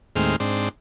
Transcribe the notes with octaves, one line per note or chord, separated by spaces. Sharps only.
D#2 A2 G#3 C4 F6
G#2 C4 D4